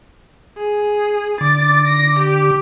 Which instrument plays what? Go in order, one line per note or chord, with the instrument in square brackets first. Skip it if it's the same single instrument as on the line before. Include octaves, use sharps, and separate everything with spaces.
[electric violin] G#4
[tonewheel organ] D3 D6 [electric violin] A6
[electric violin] A#6
G4